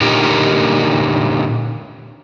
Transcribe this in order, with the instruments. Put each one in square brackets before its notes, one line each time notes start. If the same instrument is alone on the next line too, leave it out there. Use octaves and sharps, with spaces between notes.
[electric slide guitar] A#2 D3 D#4 G4 A#4